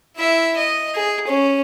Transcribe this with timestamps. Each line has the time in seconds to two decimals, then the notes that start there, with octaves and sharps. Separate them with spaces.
0.17 E4 E5
0.57 D#5
0.95 G#4
1.27 C#4